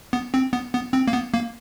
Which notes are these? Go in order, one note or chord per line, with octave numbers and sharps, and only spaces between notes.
B3
C4
B3
B3
C4
A#3
B3
A#3